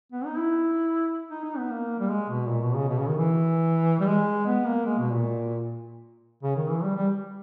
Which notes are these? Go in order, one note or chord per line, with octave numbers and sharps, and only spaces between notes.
B3
D#4
E4
D#4
D#4
B3
A#3
G3
G#3
B2
A#2
B2
C#3
B2
C#3
D#3
E3
G3
G#3
B3
A#3
G#3
B2
A#2
C#3
D#3
E3
G3
G3